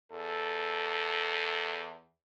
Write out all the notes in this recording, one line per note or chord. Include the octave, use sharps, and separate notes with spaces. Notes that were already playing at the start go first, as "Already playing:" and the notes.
E2 A4